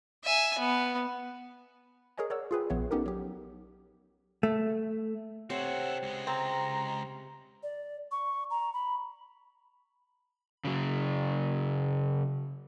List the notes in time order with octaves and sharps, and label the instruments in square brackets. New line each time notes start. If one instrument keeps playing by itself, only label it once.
[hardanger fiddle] E5 G#5
B3
[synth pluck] G#4 A#4 C#5 D#5 G#5
A#4 C#5 D5 F#5 E6
F4 G#4 B4 G5
A#1 B3 C#5 E5
B3 C#4 D#4 G4 A4 A#4
F#3 G4
[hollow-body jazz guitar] A3
[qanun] C3 C5 [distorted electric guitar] F#4 A4 [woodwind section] C#5 F#5
[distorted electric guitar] C#2 G#3
[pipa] C4 [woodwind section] A#5
[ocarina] D5
C#6
A#5
B5
[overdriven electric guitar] C#3 F#3